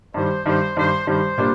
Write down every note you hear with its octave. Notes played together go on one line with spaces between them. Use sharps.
G2 D#3 G3 C5
G2 D#3 G3 C5
G2 D#3 G3 C5
G2 D#3 G3 C5
A#2 G3 A#3 D4 F4